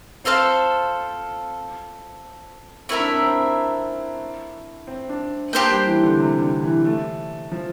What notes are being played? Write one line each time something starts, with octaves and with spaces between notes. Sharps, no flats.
C4 F4 A4 C5 F5
A3 C4 E4 A#4 E5
D4
C4
C4
C4
D4
A#3 D4 G4 C5 G5
G3
E3
D3
C3
D3
E3
A3
F3